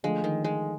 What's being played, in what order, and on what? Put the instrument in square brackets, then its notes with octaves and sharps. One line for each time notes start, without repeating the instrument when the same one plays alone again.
[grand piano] D3 F3 A3 [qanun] G#3
[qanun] D#3
G#3